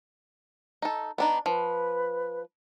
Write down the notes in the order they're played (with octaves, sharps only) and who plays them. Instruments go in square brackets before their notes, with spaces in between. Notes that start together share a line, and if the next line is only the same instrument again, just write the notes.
[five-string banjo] D#4 A4
[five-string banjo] B3 D4 D#4 [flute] A#5
[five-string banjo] F3 [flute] B4